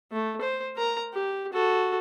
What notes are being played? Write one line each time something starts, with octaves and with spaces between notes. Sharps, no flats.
A3
C5
A#4 A#5
G4
F#4 A4